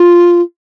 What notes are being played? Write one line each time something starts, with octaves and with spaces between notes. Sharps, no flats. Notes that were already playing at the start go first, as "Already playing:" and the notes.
Already playing: F4